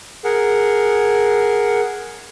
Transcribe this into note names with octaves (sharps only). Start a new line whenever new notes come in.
G#4 A#4 F#5